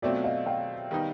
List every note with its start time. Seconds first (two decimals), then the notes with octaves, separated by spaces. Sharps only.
0.02 B2 F#3 A3 C4 F4 D5 E5
0.24 D#5 F5
0.46 F5 G5
0.91 D#3 G3 B3 D#4